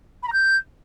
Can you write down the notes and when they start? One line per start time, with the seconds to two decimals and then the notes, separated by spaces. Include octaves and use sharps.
0.23 B5
0.28 A#5
0.33 G6